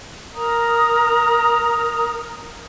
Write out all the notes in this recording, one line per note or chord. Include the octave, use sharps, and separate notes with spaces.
A#4 A#5 D#6